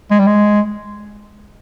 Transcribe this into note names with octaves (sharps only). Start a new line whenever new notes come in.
G#3
G3
G#3